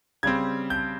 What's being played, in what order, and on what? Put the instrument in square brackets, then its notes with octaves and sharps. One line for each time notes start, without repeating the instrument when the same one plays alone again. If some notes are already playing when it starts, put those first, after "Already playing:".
[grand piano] C#3 G3 C4 G#6
G6